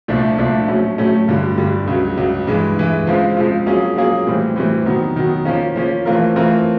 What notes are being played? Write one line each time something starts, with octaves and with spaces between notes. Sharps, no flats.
C2 A#2 F3 A3 D4
C2 A#2 F3 A3 D4
A2 F#3 A3 C#4
A2 F#3 A3 C#4
G2 D3 G3
G2 D3 G3
C#2 C#3 F#3
C#2 C#3 F#3
G2 E3 G#3
G2 E3 G#3
C#3 F3 G#3 C4 F4
C#3 F3 G#3 C4 F4
F#3 A#3 C#4 F4 G#4
F#3 A#3 C#4 F4 G#4
A2 E3 G3 C4
A2 E3 G3 C4
D#3 F#3 B3
D#3 F#3 B3
F3 A#3 C#4
F3 A#3 C#4
E3 A3 C4 F4 A#4
E3 A3 C4 F4 A#4